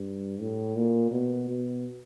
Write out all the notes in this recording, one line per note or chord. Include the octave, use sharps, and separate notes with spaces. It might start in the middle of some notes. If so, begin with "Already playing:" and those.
Already playing: G2
A2
A#2
B2
B2